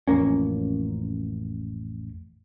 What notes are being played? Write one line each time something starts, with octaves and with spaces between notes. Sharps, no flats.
A1 F2 A#3 C#4